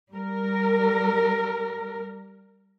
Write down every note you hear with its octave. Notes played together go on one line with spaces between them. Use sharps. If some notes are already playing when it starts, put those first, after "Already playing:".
G3 A#4